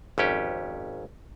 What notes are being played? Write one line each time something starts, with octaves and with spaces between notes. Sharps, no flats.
G#1 F2 C#4 G4